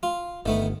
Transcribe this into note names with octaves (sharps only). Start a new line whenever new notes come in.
F4
G1 D#3 A3 B3